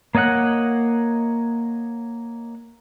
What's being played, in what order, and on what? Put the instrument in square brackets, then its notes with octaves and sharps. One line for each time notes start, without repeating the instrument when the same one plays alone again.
[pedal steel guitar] A#3 C#5 D#5 F#5 F#6